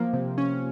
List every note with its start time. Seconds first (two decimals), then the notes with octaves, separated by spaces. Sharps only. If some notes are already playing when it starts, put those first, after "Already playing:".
Already playing: F3 A#3
0.13 C3
0.38 C#4